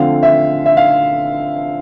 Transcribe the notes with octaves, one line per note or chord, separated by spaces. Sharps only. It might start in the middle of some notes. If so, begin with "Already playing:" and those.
Already playing: D3 F3 A3 C4 F5
E5
E5
F5